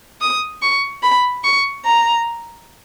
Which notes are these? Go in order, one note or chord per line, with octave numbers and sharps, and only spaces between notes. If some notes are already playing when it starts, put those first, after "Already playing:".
D#6
C#6
B5
C#6
A#5